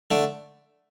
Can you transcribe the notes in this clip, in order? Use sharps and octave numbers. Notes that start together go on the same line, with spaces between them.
D3 A3 D4